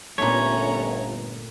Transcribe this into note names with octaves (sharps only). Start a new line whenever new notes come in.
G1 A#2 A3 B3 C#4 C#5 A#5